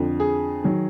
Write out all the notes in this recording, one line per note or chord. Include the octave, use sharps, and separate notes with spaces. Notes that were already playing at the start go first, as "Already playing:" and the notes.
Already playing: F2 D3 F3
G#4
D#3 F#3